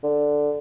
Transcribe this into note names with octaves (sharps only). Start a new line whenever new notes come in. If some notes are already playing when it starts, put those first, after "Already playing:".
D3